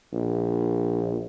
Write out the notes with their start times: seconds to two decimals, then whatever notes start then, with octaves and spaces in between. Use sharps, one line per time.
0.13 A#1